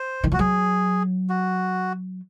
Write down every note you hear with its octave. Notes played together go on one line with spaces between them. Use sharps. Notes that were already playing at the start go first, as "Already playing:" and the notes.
Already playing: C5
D#3
F3 F#4
F#3 G#4
F#4